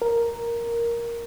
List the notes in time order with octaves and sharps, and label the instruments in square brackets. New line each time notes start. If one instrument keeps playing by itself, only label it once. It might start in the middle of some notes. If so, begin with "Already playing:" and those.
[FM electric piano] A#4